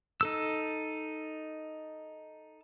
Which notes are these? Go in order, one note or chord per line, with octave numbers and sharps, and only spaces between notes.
D#4 A4 E6